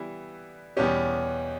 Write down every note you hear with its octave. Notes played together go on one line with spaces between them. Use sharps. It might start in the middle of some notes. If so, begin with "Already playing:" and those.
Already playing: E3 G3 B3 E4
E2 B2 G3 C#4 G4